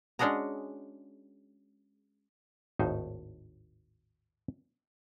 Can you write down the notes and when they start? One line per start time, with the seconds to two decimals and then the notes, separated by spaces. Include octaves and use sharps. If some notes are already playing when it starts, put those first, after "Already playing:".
0.19 G#3 C#4 D4 F#4 G#4 A#5
2.79 G#1 D#2 A2 D#4 C5